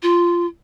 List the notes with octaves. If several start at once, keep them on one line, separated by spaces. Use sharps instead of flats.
F4